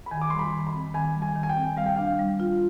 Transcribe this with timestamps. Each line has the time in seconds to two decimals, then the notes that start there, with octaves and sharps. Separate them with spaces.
0.06 B5
0.11 D#3 G#5
0.22 D6
0.30 G3 C6
0.39 B5
0.53 D#3
0.67 B5
0.74 C4
0.94 D#3 G#5
1.15 G3
1.22 G#5
1.36 D#3
1.43 G#5
1.49 G5
1.57 C4
1.77 G3 F5
1.86 G5
1.96 D4 F5
2.19 G3
2.40 F4